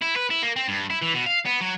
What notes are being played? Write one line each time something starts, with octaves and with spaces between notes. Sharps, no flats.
E4
B4
E4
A#3
C4
G2
E4
E3
B2
F5
B3
F#3